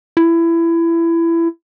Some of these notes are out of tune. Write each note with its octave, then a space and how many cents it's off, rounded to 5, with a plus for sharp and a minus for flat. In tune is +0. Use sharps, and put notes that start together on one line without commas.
E4 +20